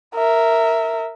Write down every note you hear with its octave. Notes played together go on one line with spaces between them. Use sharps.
A#4 E5